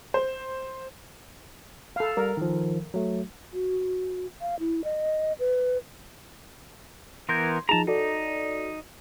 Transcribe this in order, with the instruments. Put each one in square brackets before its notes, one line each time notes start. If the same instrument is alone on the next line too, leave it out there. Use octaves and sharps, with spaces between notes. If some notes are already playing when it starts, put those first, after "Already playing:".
[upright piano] C5
[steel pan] A4 F5
[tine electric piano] G3 [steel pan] A#4
[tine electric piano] D#3 F3
F#3 A3
[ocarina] F#4
F5
E4
D#5
B4
[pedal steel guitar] E3 B3 A#4 [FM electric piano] C6 G6 G#6
[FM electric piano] F3 D#4 G#4 [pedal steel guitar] A5 A#5
[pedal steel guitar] D#4 [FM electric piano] F#4 A4 D5